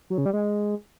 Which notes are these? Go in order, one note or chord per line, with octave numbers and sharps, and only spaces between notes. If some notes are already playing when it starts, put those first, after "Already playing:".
F#3
C#3
G3
G#3